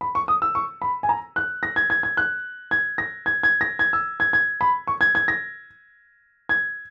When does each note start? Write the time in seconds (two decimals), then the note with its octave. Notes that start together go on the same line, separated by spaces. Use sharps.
0.01 B5
0.15 C#6
0.28 D#6
0.42 E6
0.55 C#6
0.82 B5
1.03 G#5
1.09 A#5
1.36 F#6
1.63 A#6
1.76 G#6
1.90 G#6
2.03 G#6
2.17 F#6
2.71 G#6
2.98 A#6
3.26 G#6
3.43 G#6
3.61 A#6
3.79 G#6
3.93 E6
4.20 G#6
4.33 G#6
4.61 B5
4.87 C#6
5.01 G#6
5.15 G#6
5.28 A#6
6.49 G#6